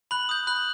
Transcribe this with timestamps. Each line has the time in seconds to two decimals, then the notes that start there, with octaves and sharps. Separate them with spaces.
0.11 B5 F#6 F#7
0.29 D#6 G6
0.47 B5 F#6 F#7